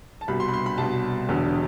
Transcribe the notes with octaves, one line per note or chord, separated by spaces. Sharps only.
A5
C2 B2 B5
C6
B5
C6
B5
C2 B2 A5
E1 E2 D3